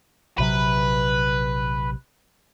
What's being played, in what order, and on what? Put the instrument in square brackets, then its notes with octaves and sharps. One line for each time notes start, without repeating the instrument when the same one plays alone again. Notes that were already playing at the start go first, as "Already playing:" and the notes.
[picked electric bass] A#1 C3 F#3 [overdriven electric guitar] B4